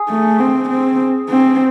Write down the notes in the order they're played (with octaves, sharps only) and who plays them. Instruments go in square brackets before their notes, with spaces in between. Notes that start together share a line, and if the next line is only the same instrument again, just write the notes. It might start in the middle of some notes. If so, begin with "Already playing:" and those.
Already playing: [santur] G#4
[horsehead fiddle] A3
C4
C4
C4